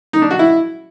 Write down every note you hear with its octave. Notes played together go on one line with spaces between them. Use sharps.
D#4
D4
F#4
E4